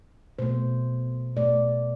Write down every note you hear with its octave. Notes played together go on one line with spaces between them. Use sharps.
B2 A3 C5
B2 A3 D5